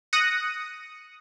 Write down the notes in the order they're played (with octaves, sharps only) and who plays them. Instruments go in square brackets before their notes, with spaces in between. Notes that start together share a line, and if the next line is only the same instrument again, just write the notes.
[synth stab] D#6 F#6 A#6 C#7 D#7